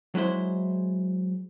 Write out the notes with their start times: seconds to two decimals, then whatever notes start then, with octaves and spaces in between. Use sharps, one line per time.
0.15 F#3 G#3 E4 C5